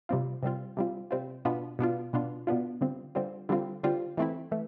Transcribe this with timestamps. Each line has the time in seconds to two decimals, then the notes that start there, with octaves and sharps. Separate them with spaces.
0.09 C3 G3 C4 F4
0.43 C3 G3 C4 F4
0.77 C3 G3 C4 F4
1.11 C3 G3 C4 F4
1.45 B2 B3 D4 F4
1.79 B2 B3 D4 F4
2.13 B2 B3 D4 F4
2.47 B2 B3 D4 F4
2.81 D3 G3 C4 F4
3.15 D3 G3 C4 F4
3.49 D3 G3 C4 F4
3.83 D3 G3 C4 F4
4.17 E3 A3 C4 E4
4.52 E3 A3